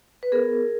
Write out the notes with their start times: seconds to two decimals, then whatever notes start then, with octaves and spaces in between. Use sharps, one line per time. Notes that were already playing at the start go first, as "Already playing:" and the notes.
0.23 B4
0.32 B3 G#4 A#4